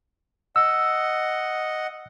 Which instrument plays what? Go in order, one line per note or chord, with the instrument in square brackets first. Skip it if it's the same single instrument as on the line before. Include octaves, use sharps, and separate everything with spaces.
[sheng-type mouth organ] D#5 F#5 [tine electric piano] E6